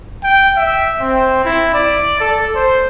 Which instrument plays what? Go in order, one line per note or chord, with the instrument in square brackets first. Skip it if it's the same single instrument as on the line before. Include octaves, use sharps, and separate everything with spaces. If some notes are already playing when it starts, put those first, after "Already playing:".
[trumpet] G5
E5
C4
E4
D5
A4
C5